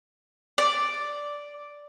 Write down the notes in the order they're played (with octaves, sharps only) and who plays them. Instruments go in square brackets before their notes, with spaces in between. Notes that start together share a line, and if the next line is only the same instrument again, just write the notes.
[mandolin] D5